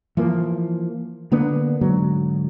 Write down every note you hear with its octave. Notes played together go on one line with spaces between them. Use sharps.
E3 F3 A#3
D3 A#3 B3 D4
G#2 D3 F#3